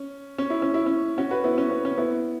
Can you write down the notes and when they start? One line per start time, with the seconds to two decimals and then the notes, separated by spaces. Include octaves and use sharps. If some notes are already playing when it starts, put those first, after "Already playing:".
Already playing: C#4
0.38 C#4
0.50 E4
0.62 C#4
0.74 E4
0.86 C#4
1.18 C#4 F#4
1.31 F#4 B4
1.44 B3 E4
1.58 C#4
1.71 B3
1.85 C#4
1.98 B3 E4